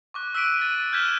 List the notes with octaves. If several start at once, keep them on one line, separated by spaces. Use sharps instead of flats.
C#6 D6 F#6
E6 F#6 B6 D7 D#7
A6
F6 G6 G#6 B6 E7 G7